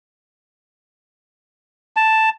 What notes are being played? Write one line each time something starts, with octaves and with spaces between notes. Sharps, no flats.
A5